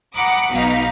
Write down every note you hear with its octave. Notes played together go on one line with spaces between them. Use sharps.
F#5 A#5 B5 D6 D#6
B1 B2 D#4 F5 B6